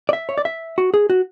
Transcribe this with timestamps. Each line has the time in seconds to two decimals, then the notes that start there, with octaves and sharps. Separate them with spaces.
0.09 D5
0.13 E5
0.29 C#5
0.38 D5
0.45 E5
0.78 F#4
0.94 G#4
1.10 F#4